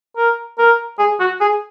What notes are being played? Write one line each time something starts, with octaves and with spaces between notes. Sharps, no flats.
A#4
A#4
G#4
F#4
G#4